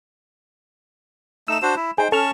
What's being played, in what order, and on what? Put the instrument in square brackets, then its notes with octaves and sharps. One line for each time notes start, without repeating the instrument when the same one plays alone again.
[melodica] A3 D#4 [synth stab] E6 E7
[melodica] D4 F#4 C5
E4
[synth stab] D#4 G#4 [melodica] C5 G5
[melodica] C#4 A5 C#6 [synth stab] A4 F6